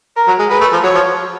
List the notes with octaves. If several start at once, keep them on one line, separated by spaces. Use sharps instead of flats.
A#4
F#3
G#3
G#3 B4
A3
F3
F#3 C#5
F3